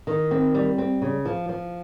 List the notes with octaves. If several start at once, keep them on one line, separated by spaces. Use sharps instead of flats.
D#3
C4
G3
C4
C#3
F3
F3